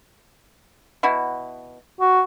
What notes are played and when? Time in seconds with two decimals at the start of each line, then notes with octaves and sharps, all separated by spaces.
1.03 B2 E4 F#4
2.01 F#4